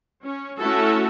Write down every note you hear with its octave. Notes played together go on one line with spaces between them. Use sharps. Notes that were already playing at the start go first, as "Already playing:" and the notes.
C#4
A3 C#4 E4 F#4 A4